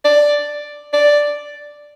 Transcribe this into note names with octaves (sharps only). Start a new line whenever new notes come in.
D5
D5